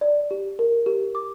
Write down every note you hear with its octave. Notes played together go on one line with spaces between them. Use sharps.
D5
G4
A#4
G4
D6